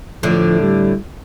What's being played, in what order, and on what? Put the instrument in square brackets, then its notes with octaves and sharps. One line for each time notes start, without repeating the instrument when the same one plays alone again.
[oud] A2 D3 [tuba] F3
[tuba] G3